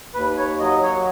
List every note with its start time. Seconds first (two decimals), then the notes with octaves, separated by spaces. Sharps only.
0.14 D#2 B4
0.37 C#5
0.60 F#3 D#5
0.83 C#5